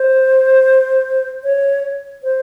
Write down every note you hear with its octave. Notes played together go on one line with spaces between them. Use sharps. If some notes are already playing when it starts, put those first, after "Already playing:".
Already playing: C5
C#5
C5